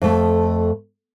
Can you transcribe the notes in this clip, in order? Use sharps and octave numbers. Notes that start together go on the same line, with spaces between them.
F2 A3